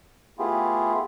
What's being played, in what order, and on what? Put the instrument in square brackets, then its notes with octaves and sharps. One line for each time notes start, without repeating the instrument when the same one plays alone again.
[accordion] A3 B3 E4 F4 G4 G#4